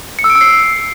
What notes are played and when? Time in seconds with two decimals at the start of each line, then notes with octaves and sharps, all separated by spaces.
0.19 C#7
0.24 E6
0.30 D7
0.35 E6
0.41 C7